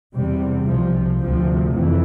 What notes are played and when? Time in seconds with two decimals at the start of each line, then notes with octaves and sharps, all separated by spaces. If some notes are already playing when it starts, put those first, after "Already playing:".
0.14 E2 C3 G3
0.67 C3 F3
0.72 C2
1.20 D2 C3 F3
1.73 F2 E3